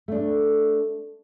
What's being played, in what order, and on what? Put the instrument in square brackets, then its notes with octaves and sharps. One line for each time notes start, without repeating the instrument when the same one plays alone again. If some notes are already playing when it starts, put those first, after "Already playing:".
[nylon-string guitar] A3 D4